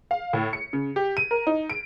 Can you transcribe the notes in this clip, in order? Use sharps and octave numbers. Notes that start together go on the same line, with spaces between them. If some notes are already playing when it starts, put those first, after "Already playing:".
F5
A2
C#7
C#3
G4
D#7
A#4
D#4
D7